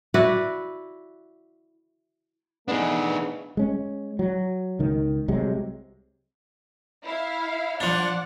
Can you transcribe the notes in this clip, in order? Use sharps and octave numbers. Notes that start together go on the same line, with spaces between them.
E4 F#4 B4 D5
E3 A3 B3 D4 D#4 G#4
G#3 C#4
F#3
C#2 D#3
C2 C3 F#3 G#3
E4 F5
F3 D4 D5 F#5